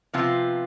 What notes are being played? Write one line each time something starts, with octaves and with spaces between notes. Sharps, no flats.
C3 F3 B3 F4